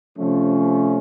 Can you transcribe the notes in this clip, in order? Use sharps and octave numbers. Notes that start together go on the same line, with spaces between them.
C3 F3 A3 C#4